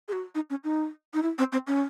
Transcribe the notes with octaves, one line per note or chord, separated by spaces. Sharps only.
G#4
F#4
D#4
C#4
D#4
D#4
E4
C4
C4
C#4